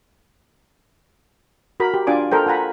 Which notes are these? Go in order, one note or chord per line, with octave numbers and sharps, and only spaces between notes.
F#4 A#4 B5
G4
D4 F4 D5 G#5 D6
A4 A#4 C5 G5
F4 F#5 G#5 A#5 B5